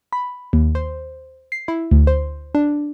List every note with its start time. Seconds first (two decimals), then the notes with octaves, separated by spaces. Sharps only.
0.13 B5
0.53 D#2
0.75 C5
1.52 C7
1.68 E4
1.91 D2
2.07 C5
2.55 D4